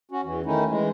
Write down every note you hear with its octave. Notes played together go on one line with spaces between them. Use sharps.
C#4 F#4
E2 E3
D#3 A3 C#4 D#4 E4
E3 G#3